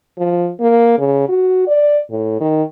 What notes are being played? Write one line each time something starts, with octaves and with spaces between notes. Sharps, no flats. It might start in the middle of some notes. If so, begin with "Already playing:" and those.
F3
A#3
C#3
F#4
D5
A2
D#3